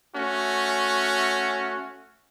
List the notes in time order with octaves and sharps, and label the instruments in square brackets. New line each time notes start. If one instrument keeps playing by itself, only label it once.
[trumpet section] A3 C#4 F#4